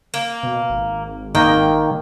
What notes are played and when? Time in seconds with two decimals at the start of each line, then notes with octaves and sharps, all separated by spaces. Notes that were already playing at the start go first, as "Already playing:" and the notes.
0.14 A#3
0.43 B2
0.70 G#1
1.35 D#3 A#3 D#5 G5